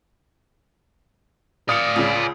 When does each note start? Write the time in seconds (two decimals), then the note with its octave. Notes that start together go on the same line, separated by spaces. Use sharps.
1.69 D5 F5 D#6 C#7
1.96 C#2 C#3